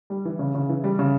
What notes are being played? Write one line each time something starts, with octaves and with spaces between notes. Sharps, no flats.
G3
E3
C#3
C#3
E3
G3
C#3